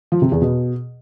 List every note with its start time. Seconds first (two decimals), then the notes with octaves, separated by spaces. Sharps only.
0.12 F3
0.22 C3
0.32 E2
0.42 B2